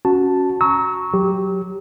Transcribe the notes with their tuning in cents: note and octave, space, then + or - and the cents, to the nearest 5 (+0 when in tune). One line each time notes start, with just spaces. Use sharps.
C#4 +0 F#4 -10 A5 +0
A#5 +0 C#6 +0 E6 -35
F#3 +0 G4 +0